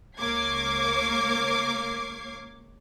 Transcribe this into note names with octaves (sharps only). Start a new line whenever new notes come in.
C#2 A#3 C#5 D6 G#6 C7